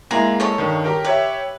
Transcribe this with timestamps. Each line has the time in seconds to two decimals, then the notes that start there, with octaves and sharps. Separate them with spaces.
0.11 G#3 A#3 E4 G#4 A#5
0.40 A4 C#5 D#5
0.58 G2 D#3
0.84 G4 A#4 G5
1.05 G4 B4 C#5 E5